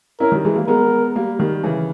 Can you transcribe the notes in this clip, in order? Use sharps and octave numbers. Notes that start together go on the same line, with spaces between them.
C#4 E4 A#4
D#3 G3
E3 G#3
G3 A#3
G#3 B3 A#4
G3 A#3
D#3 G3
C#3 E3